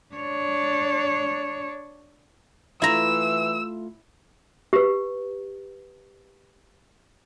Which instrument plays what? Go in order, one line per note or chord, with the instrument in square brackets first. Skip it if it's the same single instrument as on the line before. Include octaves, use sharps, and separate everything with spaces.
[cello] D4 C#5
[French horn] E3 [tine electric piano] A3 F4 [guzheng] E4 A#5 [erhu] E6
[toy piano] G4 B4